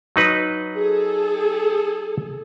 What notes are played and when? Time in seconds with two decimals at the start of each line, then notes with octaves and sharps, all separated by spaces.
0.16 F#3 D#4 B4
0.76 G#4 A4